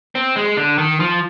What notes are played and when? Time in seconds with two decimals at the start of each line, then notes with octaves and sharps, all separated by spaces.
0.15 C4
0.36 G#3
0.57 D3
0.78 D#3
1.00 F3